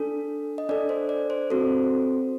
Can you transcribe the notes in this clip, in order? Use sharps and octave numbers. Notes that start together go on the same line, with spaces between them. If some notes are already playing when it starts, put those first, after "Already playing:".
Already playing: D4 A4
D#5
D4 A4 D5
C5
D5
C5
C4 F#4 A4 C5